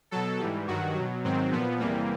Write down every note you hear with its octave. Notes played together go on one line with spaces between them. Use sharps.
B2 F#3 A4
G#2 E3 G3
G2 D#3 F#3 F#4
B2 F#3
G#2 D#3 F#3 C4
A#2 F3 B3
E2 C3 E3 G3 A#3